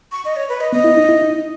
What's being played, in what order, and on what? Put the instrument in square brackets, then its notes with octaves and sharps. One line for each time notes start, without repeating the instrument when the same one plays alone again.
[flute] C#6
D#5
C#5
B4
D#5
[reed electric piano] B3 [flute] D#5
[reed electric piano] E4
D#4
E4
D#4